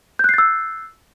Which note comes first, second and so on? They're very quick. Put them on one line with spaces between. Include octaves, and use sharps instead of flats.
G6 F#6 C7 A6 E6